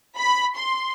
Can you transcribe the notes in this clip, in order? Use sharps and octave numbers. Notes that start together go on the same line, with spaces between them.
B5
C6